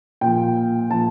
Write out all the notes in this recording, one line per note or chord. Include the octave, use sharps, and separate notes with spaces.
A#2 F3 G5
A#2 F3 A5